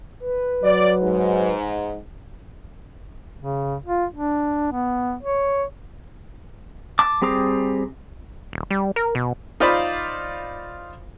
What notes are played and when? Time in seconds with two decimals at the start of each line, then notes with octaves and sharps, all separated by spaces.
0.20 B4
0.63 F#3 D5
1.02 G#2
3.38 C#3
3.86 F4
4.13 D4
4.72 B3
5.23 C#5
6.99 A5 D6
7.22 G3 C4 G#4 A#5 D6
8.53 D#1
8.70 G3
8.96 A#4
9.15 B2
9.60 D#4 F4 C5 D5 F5 B5